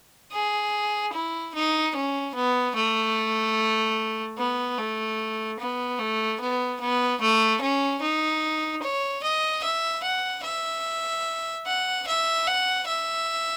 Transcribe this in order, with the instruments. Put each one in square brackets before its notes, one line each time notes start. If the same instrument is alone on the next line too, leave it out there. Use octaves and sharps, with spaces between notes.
[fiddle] G#4
E4
D#4
C#4
B3
A3
B3
A3
B3
A3
B3
B3
A3
C#4
D#4
C#5
D#5
E5
F#5
E5
F#5
E5
F#5
E5